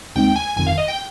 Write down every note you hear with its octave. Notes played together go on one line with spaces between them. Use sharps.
D#2 C#3 G#3 C4 D#4 G5
G#5
G1 F2 D#3 G#5
F5
D#5
G5